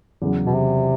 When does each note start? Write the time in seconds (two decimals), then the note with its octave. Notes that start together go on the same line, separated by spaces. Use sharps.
0.22 E2 C#3 F#3
0.46 B2
0.54 C3